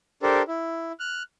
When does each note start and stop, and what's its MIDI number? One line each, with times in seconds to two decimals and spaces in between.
0.23 0.42 62
0.23 0.42 67
0.23 0.42 69
0.23 0.42 70
0.23 0.42 72
0.48 0.92 64
1.00 1.23 89
1.00 1.23 90